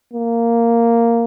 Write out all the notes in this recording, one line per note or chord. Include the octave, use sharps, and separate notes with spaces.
A#3